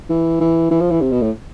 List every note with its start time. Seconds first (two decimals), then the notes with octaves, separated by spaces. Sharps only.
0.10 E3
0.40 E3
0.71 E3
0.80 F3
0.91 E3
1.01 C3
1.11 B2
1.22 A2